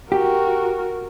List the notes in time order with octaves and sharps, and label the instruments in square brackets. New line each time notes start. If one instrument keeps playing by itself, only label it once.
[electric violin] F#4 A#4 [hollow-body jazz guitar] G4